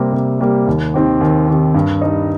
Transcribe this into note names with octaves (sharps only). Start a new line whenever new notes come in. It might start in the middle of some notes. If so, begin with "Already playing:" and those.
Already playing: C3 G3 A#3 G4
C3
G3 A#3 G4
D#2
D#3 C4 G4
D#2
D#3 C4 G4
G2
G3 D#4